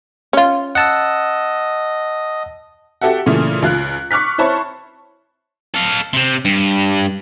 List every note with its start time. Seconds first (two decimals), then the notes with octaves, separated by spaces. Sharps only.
0.33 C#4 F4
0.75 D#5 F#5 A5 E6
3.02 F#4 G4 A4 E5 F#5
3.26 A#2 C#3 E3 A3
3.62 C#2 F4 F#6
4.11 C#6 D6 F6 F#6 B6
4.38 E4 C5 C#5 A5 B5 C#6
5.74 A4 F5
6.13 C3 C4
6.45 G2